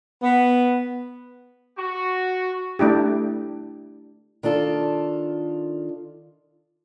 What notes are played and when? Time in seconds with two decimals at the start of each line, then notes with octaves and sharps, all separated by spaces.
0.23 B3
1.78 F#4
2.79 A3 D4 E4 G4
4.43 D#3 D4 F4 A4